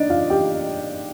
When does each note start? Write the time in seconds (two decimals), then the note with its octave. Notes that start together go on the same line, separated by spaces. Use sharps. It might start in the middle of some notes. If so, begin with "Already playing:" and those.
Already playing: D4 D#4 D5 D#5
0.10 F4 F5
0.30 G4 G5